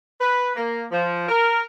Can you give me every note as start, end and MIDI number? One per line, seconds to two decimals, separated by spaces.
0.20 0.52 71
0.55 0.86 58
0.91 1.26 53
1.28 1.61 70